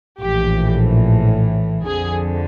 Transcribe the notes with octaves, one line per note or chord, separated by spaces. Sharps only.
A#1 A2 E3 G4
F2 D3 G#4